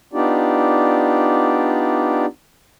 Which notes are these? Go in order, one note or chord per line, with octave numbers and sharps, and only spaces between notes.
B3 D4 D#4 F4 G4 D5